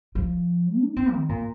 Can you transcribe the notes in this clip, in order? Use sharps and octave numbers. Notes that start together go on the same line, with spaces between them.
F3
D#4
C4
D#3
A#2